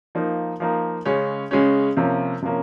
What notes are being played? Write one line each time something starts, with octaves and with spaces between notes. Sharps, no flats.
F3 A#3 D#4
F3 A#3 D#4
C#3 G#3 C#4
C#3 G#3 C#4
C3 F3 A#3 C#4
C3 F3 A#3 C#4